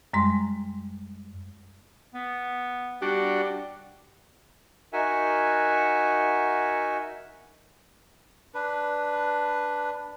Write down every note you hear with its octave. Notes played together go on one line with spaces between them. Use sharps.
F#2 G3 G#3 C6
B3
G3 D4 F#4 G4
D#4 F#4 A#4 E5 F#5 G#5
D4 B4